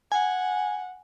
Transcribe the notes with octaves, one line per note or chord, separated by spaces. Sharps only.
F#5 G#5